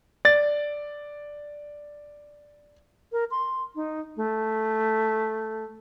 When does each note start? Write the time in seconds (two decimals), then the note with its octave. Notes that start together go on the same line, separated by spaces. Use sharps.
0.25 D5 A6
3.12 A#4
3.31 C6
3.75 D#4
4.17 A3